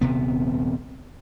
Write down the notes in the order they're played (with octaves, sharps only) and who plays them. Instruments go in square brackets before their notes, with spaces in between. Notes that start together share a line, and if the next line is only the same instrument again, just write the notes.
[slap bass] D#1 C3 B3